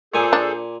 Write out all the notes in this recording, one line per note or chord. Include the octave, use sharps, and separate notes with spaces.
A#2 G#4 A4 C5 G#5 D6
D4